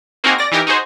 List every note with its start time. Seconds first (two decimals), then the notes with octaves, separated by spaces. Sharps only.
0.24 A#3 C4 D#4 F#4 G#4 A#4
0.38 D5 A#6
0.52 E3 D#4 G4 A#4
0.67 D#4 F#4 G#4 C5